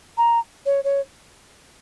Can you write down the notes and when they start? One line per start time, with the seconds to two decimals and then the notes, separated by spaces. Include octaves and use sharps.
0.17 A#5
0.66 C#5
0.84 C#5